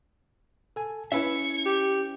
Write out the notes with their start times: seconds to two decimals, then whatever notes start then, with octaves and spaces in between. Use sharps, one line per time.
0.76 A4 G#5
1.12 C#4 E4 B4 E5 G#6 C#7
1.66 G4